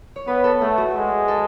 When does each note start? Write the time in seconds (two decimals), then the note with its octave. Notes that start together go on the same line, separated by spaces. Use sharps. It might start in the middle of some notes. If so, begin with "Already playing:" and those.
0.16 C#5
0.27 B3 B4
0.44 A4
0.61 A3 G#4
0.78 F#4
0.95 G#3
1.28 A4